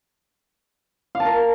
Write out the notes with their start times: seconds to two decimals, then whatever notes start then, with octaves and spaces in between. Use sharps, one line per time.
1.15 F5
1.20 A5
1.25 A#4